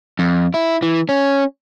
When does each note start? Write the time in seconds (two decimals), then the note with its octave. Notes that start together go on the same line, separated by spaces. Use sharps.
0.19 F2
0.54 E4
0.82 E3
1.09 C#4